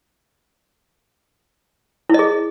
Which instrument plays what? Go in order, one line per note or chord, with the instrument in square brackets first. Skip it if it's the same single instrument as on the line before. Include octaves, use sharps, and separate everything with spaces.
[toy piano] E4
D#5
G#4